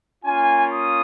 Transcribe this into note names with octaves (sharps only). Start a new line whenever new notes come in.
A#3 C#4 F4 G#5
D#6